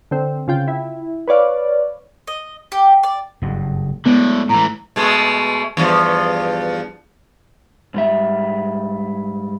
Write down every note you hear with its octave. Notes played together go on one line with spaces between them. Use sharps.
D3 C4
C#3 F4 G5
E4
B4 C#5 D5 F5
D#5
G4
D5
F#1 G2
A2 D3 G#3 A3 B3
A2 E3 A#5
B2 G#3 A3
E2 G2 F3
G#2 G3 E5